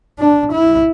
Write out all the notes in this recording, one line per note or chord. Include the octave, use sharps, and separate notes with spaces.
D4
E4